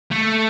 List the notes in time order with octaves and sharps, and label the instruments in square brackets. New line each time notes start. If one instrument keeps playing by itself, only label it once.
[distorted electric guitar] A3